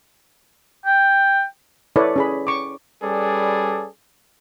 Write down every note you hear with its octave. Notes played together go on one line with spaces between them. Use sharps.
G5
E4 A4 B4 C#5 D5
C#4 G#4 B5
C#6 D6
G3 C#4 G#4 A4 B4 D5